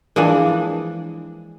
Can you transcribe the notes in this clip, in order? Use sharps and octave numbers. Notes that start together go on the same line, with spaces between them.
E3 F3 G#3 A#3 D4